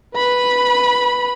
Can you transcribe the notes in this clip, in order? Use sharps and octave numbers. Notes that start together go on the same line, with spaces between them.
B4 B5